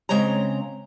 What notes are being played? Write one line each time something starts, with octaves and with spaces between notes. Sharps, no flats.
C#3 G#3 C4 C#5 A#5